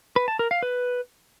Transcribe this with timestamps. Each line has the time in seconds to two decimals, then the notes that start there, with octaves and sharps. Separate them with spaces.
0.16 B4
0.28 A5
0.39 A#4
0.51 F5
0.63 B4